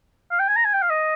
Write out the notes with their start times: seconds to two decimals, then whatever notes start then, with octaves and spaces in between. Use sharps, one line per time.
0.31 F5
0.39 G5
0.48 G#5
0.56 A#5
0.65 G#5
0.74 G5
0.82 F5
0.90 D#5